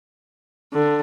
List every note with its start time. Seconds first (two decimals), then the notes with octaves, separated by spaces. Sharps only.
0.72 D3